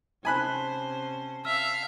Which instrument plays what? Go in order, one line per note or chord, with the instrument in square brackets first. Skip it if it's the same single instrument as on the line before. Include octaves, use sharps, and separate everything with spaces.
[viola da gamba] C3 C#4 C5 [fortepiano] G#5 B5 F#6 [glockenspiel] A5
[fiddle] E5 F5 [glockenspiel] E6 F6